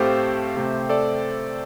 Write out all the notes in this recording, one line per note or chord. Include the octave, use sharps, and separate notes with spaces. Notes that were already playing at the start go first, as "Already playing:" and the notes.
Already playing: A2 A3 C4 G4 A4 C5 F5
C3 A3 C4
A4 D5